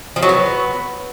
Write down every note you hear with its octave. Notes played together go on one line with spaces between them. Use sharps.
F3
F#3
B3